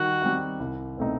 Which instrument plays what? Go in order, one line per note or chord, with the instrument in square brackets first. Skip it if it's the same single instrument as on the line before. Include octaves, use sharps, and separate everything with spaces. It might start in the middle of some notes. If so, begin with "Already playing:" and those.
Already playing: [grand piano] D#3 G3 D#4 [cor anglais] F#4
[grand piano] G3 C4 D#4
C2
B2 A3 C4 D#4